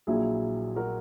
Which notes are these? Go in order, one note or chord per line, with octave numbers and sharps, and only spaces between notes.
A#1 A#2 F#3 E4 G#4
F#4 A#4